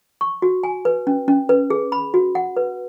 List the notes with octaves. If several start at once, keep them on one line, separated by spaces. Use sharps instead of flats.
C#6
F#4
G#5
B4
C#4
C#4
B4
G#4
B5
F#4
F#5
B4